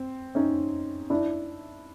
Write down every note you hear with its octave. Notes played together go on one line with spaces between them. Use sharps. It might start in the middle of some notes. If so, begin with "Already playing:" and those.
Already playing: C4
C#4 D#4
D4 E4